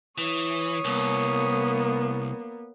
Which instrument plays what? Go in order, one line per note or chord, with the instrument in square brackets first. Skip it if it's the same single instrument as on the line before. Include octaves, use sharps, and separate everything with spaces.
[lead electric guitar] E3 [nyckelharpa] C#5 D#6
[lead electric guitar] C2 [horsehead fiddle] A#3 B3